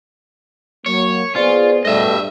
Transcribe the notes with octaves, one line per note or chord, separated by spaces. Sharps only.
F#3 A#3 C#5
B3 F4 G#4 C5 D5
G2 B2 G3 A3 D#5 E5